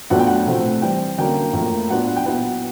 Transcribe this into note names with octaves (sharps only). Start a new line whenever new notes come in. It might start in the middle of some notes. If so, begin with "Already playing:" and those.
A2 F#3 B3 D4 F4 F#5
G5
F#5
C3 F3 A3 C4
E3 G3 C4 G5
D3 F#3 A#3 C#4 G5
A2 F3 A#3
F#3 B3 D4 F4 F#5
F#5
G5
A#2 F#3 B3 E4 F#5